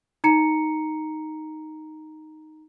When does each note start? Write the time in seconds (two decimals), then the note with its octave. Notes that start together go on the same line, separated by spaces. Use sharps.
0.24 D#4 A#5 C#7